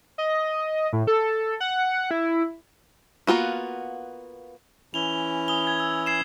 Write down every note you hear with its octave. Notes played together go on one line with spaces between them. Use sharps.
D#5
A2
A4
F#5
E4
A#3 B3 F4 F#4
E3 C#4 E4 F7 G7
D#6 G7
G#6
E6
G#6 C7 E7